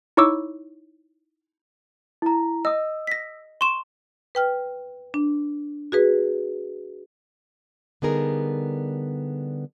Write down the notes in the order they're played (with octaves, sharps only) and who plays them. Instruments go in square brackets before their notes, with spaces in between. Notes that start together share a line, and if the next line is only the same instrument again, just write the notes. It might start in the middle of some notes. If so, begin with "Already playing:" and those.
[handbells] D#4 E4 C#5 C#6 D6 E6
[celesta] E4 A#5
[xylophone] D#5 [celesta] D#6 E6
[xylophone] A#6 B6
C6 C#6 E7
[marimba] B4 G5 F6
D4
F#4 G#4 B4
[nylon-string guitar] D3 G3 B3 D#4 G#4 A#4